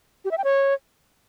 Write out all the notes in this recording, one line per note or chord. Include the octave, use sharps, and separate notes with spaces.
G4
E5
G5
C#5